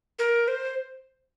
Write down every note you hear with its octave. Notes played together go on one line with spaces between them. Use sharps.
A#4
C5